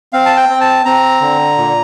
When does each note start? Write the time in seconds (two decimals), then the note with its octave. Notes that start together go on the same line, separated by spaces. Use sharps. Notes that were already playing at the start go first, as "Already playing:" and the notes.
0.13 C4 F5
0.26 A5
0.37 G5
0.49 C4
0.61 A5
0.85 C4 A#5
1.21 D3
1.58 A#2